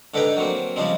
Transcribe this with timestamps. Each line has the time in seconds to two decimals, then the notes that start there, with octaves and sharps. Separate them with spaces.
0.14 G#2 D3 A4 B4 G5 A#5
0.37 F#3 A#3 C4
0.76 C#3 F3 G3 G#3 C4